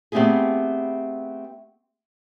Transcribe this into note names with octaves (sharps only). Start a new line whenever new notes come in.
A3 B3 C4 E4 G4 G#4